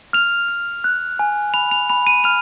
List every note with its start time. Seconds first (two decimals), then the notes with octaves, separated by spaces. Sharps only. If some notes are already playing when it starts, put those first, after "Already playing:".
0.13 F6 F7
0.49 F6
0.84 F#6
1.19 G#5
1.54 B5 F7
1.71 F7
1.89 B5 F7
2.07 D#7
2.24 F6 F7